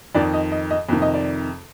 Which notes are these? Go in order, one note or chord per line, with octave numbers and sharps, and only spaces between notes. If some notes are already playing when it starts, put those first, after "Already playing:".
F2 D#3 D5
D#5
D#5
D#5
F2 C3 D#3
D#5
D5